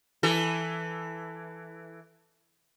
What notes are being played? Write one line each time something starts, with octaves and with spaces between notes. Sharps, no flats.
E3 A4